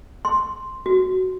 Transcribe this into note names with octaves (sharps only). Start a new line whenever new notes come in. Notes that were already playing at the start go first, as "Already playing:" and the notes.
C6
F#4